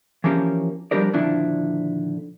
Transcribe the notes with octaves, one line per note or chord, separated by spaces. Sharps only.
E3 F3 A#3 C#4 G4
F3 G3 D4 G4 A#4 D5
A#2 D3 D#3 F3 D4 E4